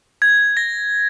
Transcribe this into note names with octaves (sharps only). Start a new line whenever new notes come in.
G#6
A#6